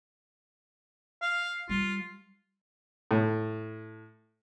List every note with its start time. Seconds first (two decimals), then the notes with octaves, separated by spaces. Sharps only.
1.22 F5
1.69 G3 F4
3.11 A2